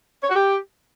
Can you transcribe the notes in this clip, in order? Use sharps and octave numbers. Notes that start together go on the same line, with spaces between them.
C#5
F#4
G4